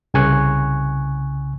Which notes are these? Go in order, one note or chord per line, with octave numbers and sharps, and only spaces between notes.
C2 C#3 G#5 C#6 F#6